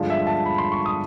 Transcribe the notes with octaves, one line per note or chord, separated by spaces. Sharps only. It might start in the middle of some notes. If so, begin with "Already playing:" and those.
Already playing: G2 D3 F3 G#3
E5
A5
B5
C6
C#6
D#6